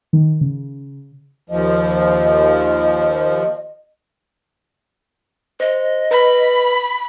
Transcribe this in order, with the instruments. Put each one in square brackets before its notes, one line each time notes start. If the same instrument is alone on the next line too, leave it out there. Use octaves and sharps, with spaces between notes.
[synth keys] D#3
C#3
[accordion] D#2 F3 [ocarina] D#5
[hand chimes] C5 [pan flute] D#5
[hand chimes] B4 [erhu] B5